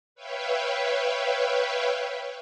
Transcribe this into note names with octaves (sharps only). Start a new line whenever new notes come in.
B4 C#5 E5 F5 G5